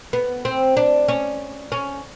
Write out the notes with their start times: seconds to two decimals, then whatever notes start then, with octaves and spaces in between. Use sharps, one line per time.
0.13 B3
0.45 C4
0.77 D4
1.08 C#4
1.72 C#4